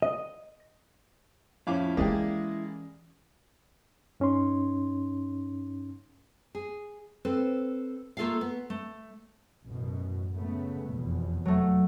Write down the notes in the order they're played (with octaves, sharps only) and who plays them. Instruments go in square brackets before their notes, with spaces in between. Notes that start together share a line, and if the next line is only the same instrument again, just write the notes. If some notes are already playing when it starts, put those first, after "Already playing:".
[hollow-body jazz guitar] D#5
[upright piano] F2 A2 C#4 [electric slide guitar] E4 [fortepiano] F5 D6
[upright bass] E3 C#4 [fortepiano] G#3 A#3 [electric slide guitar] E4 [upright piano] G4 D5
[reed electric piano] G2 C#4 D#4 C6
[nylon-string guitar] G#4
C4 A4 B4 C5
A3 A#3 F4 A4 E5 F5
B3
A3
[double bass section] A1 F#2 B2
C#3 A3 B3
F1 E2 B2
[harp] F#3 A3